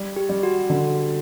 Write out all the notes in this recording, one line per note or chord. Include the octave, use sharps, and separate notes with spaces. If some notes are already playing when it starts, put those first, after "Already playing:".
Already playing: G3
G4
G3
F#4
D3